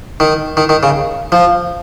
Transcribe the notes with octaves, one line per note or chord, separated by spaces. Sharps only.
D#3
D#3
D#3
C#3
F3